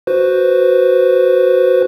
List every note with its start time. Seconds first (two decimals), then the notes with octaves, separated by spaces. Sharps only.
0.07 F#4 B4 C5